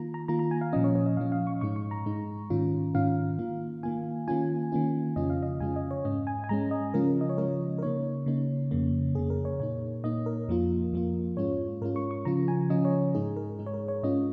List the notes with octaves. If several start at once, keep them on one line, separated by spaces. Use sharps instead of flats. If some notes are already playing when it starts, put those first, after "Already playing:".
Already playing: D#3 A#3 F4 A#5
A#5
D#3 A#3 F4 A#5
A#5
G#5
F5
A#2 F3 C#4 D#5
C#5
C#5
D#5
A#2 F3 C#4 F5
F5
C#6
G#2 G#3 D#4 C#6
C#6
A#5
G#2 G#3 D#4
G#2 D#3 C#4 F4
G#2 D#3 C#4 F4 F5
D#3 A#3 F4
D#3 A#3 F4 G#5
D#3 A#3 C#4 F4 G#5
D#3 A#3 C#4 F4
F2 C#3 G#3 C#4 F4 D#5
F5
D#5
F2 C#3 G#3 C#4 F4 G#5
D#5
C#5
G#2 G#3 C#4 D#5
G#5
G#5
G#2 G#3 C#4 A#5
D#5
C#3 F3 G#3 C#4 F4 A#4
D#5
C#5
C#3 F3 G#3 C#4 F4 A#4
A#4
C#3 A#3 D#4 C#5
C#3 A#3 D#4
F2 C#3 A#3
F2 C#3 A#3 G#4
A#4
C#5
A#2 A#3 D#4 C#5
A#2 A#3 D#4 D#5
A#4
F2 F3 A#3 F4
F2 F3 A#3 F4
G#2 G#3 C#4 F4 C#5
G#2 G#3 C#4 F4 A#4
C#6
C#6
C#3 F3 C#4 F4 A#5
G#5
C#3 F3 C#4 F4 D#5
C#5
G#2 G#3 D#4 G#4
A#4
G#2 G#3 D#4
C#5
A#4
C#5
G#2 G#3 C#4 F4 D#5